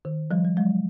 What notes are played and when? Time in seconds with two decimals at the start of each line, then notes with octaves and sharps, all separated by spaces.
0.05 D#3
0.31 F3 G3
0.45 G3
0.57 F#3 G#3